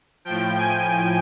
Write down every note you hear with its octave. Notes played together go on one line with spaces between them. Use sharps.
A2 F3 G5
G#5